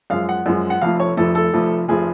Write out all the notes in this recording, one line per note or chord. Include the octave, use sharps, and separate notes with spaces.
F#2 F3 G#3 F5
F#5
F#2 F3 G#3
F#5
F1 F2 F3 A3 F5
C#5
F1 F2 F3 A3 A4
A4
F1 F2 F3 A3
F1 F3 A3 G#4